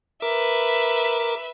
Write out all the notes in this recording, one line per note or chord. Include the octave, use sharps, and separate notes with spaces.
A#4 B4 E5 D6